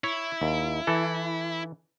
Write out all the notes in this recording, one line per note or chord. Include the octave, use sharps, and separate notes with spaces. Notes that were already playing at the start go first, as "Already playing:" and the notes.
E4 C#5
D#2
E3 A4